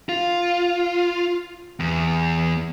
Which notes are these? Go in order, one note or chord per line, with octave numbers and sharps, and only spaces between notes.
F4
E2